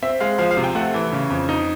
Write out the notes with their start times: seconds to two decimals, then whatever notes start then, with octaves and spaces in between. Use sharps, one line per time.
0.02 C4 E5
0.20 G#3 F5
0.38 F3 F5
0.51 F5
0.57 C3
0.64 G5
0.75 A3 F#5
0.94 E3
1.13 C#3
1.30 F2
1.49 D#4